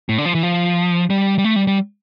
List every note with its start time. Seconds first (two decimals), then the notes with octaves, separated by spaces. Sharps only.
0.09 A2
0.18 D3
0.25 F3
0.35 E3
0.43 F3
1.10 G3
1.38 G3
1.44 A3
1.56 G3
1.67 G3